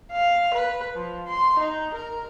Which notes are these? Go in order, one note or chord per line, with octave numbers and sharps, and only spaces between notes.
F5
B4
F3
C6
D#4
A#4